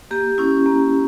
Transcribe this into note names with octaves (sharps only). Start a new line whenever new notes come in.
A#3 G4
C#4 E4
A#3